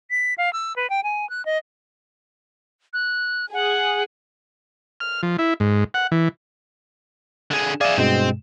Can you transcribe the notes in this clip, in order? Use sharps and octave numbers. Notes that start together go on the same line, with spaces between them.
B6
F5
E6
B4
G5
G#5
F#6
D#5
F#6
G#4 F#5
F6
F3
E4
G#2
F#5
E3
D3 G#4
G#4 D5 E5 F5
G2 B2 G#3 C4